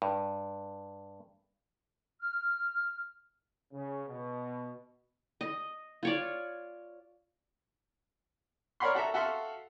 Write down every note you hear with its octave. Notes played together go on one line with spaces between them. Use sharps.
G2
F6
C#3
B2
D#5
F4 C#5 D5
A#4 C#5 D5 F#5 B5 C6
F#4 A4 E5 A#5
F#4 A4 E5 F5 C6